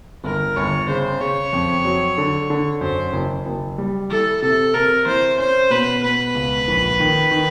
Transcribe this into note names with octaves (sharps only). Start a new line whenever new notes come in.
G1 A#4
G1 C#5
C#3 C5
C#3 C#5
F2
F#3
D3
D3
F#2 C5
F#1
F#1
G3
E3 A4
C3 A4
C3 A#4
E3 C5
C#4 C5
B2 B4
B2 B4
C#2
A#1
D#3
D#3